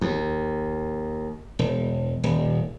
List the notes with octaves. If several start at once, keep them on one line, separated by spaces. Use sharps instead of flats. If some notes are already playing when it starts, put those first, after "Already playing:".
D#2
E1
D#1